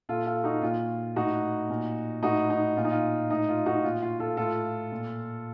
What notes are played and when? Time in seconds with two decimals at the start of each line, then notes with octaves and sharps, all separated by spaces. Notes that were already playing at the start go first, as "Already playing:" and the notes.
0.09 A#2 F4 A4
0.26 F4 A4
0.44 D#4 F#4
0.62 A#2 F4
1.16 A2 D#4 F#4
1.70 A#2
2.23 A2 D#4 F#4
2.50 D#4
2.76 A#2 F4
2.84 D#4
2.91 F4
3.30 A2 D#4
3.49 F4
3.66 D#4 F#4
3.84 A#2 F4
4.02 F4
4.20 F4 A4
4.37 A2 F4 A4
4.92 A#2